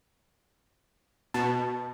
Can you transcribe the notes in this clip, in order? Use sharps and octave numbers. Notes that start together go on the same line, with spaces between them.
B2 A5